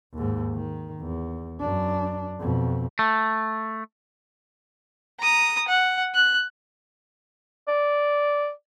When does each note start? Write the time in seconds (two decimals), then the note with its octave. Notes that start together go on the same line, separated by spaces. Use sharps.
0.14 D#2 G#2
0.54 D#3
1.01 E2
1.61 F#2 D4
2.40 F2 B2
2.99 A3
5.20 A#5 D#6
5.68 F#5
6.15 F#6
7.68 D5